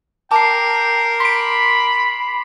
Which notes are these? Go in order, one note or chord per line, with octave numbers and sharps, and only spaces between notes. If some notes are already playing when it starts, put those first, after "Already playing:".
A#4 G5 A5 D6 C7
B5 C6 B6 D7